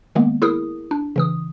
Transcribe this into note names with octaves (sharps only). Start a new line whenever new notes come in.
D#3 G#3 A#3 B3
E4 G#4 A#4 D#6
D4
C#3 E3 D#6